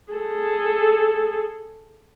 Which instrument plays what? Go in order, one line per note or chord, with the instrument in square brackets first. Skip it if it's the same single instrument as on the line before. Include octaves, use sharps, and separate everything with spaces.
[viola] G#4 A4